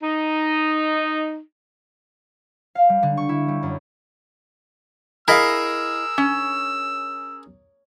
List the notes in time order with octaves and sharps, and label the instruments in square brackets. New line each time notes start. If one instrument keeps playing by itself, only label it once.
[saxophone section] D#4
[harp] F5
G3
D3
C#6
E4
G3
F#2
[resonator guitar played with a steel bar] E4 D#5 F5 [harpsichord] G#4 A#4 [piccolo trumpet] E6
[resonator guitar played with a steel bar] C#4